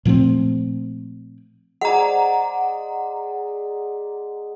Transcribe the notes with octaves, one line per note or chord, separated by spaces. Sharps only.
A#2 F3 A3 C4
G#3 D5 F#5 A#5